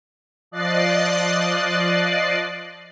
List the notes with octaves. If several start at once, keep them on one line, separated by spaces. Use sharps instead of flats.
F3 D5 D#5 F#6 A6 C7